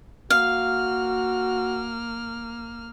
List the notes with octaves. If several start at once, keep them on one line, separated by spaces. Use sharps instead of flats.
A#3 F#4 F5 F6